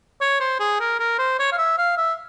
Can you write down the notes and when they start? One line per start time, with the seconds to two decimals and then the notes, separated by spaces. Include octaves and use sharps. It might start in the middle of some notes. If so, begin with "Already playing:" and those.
0.21 C#5
0.40 C5
0.60 G#4
0.80 A#4
0.99 A#4
1.18 C5
1.39 C#5
1.52 F5
1.58 E5
1.78 F5
1.97 E5